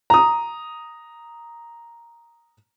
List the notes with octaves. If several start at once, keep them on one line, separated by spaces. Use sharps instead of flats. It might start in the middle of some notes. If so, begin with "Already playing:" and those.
A#5 D#6